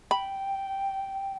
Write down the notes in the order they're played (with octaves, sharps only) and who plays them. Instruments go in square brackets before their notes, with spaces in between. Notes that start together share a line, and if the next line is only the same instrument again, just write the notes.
[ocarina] G5 [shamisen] B5